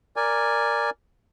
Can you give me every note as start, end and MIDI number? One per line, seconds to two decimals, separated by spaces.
0.16 0.90 70
0.16 0.90 74
0.16 0.90 80